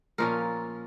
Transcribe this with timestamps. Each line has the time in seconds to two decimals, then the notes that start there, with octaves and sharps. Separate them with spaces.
0.18 A#2 F3 A#3 C#4 A#4